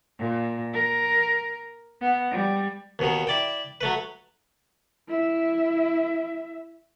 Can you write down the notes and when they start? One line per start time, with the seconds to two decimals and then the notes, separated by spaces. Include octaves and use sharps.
0.19 A#2
0.73 A#4
2.01 B3
2.31 G3
2.99 D#2 B2 D#3
3.27 E4 D5 G5
3.81 F#3 A3 B4
5.08 E4 E5